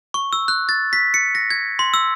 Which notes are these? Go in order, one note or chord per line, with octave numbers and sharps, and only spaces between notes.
C#6
E6
F#6
A6
B6
C#7
A#6
G#6
C6
E6